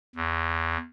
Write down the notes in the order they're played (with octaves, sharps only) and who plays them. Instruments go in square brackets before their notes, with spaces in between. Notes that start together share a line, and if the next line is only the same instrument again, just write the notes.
[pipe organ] E2